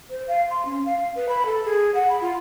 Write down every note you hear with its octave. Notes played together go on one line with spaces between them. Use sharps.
C5
F5
C6
C#4
F5
B4
B5
A4
G#4
F#5
B5
F4